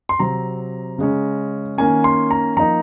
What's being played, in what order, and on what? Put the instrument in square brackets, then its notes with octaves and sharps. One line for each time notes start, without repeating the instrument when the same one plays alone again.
[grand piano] C6
C3 F#3 C4 A#5
C#3 G#3 C#4
D#3 A#3 C#4 G#5
C6
A#5
F3 A#3 D#4 A#5